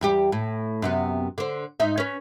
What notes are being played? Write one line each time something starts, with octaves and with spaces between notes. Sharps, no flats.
E2 G3 G4
A2
F#2 C3 B3
D3 C5
G#2 D#4 E5
C#4 B4